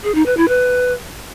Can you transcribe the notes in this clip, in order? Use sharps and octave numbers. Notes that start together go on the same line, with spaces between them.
G#4
D#4
B4
E4
B4